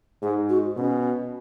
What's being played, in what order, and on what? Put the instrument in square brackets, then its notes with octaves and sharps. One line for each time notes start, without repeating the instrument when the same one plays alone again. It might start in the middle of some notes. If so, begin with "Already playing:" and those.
[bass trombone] G#2 [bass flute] G#4
[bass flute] F#4
[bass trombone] B2 [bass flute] C#4